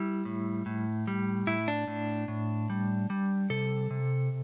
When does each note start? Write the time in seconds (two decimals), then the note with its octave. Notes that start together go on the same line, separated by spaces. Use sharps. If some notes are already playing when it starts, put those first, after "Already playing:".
Already playing: G3 E4
0.25 A2
0.66 A2
1.07 G3
1.47 A2 E4
1.68 D4
1.88 A2
2.28 A2
2.70 G3
3.10 G3
3.50 C3 A4
3.90 C3